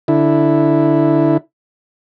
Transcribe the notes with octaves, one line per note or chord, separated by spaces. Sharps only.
D3 E4